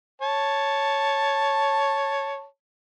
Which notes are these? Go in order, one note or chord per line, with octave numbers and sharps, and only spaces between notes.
C#5 A5